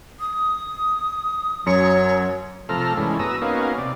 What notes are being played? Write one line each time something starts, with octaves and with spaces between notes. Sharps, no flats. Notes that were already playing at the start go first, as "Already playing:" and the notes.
D#6
F#2 F#3 C#5 C#7
C3 F3 A3 A4 A#5 F6
G2 E3 G#3 A3 C#4
B3 F#4 A#5 D#6 E6
A#3 B3 C#4 D#4 F#4 F5
C3 D5